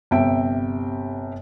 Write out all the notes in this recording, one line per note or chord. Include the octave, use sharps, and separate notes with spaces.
G1 C3 E5 G5 D7